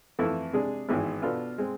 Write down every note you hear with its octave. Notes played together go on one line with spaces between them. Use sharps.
F2 E3 A3 E4 A4
C3 G#3 D4 G#4
G#1 G#2 E3 G#3 B3
B2 B3 D4 F4 A4
G#3 C4